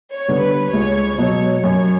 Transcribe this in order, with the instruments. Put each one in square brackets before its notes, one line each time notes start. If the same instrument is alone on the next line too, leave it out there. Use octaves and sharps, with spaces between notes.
[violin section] C#5
[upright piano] D3 G3 B3
[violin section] B4
[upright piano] C#2 [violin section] C#5
[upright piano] B2 F#3 [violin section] C#5
[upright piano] F#2 [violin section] C#5